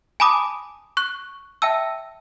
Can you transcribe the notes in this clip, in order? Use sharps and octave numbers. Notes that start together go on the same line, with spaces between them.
G#5 A5 B5 D6 D#6
C#6 F#6
E5 G5 A5 E6